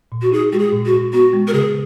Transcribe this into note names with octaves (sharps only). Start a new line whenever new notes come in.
A#2
F#4
D#4 G#4
G#3 F#4
G#4
A#2
F#4
A#2
B3 F#4
G#3
A#4
C#3 G#4